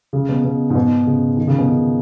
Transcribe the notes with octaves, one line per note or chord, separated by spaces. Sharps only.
C#3
B2
B2
G#2
B2
C#3
D#3
C#3
B2
C#3